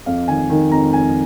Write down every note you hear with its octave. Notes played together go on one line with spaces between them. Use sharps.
F2 F5
D#3 G#5
D#3
F2 A#5
F2 G#5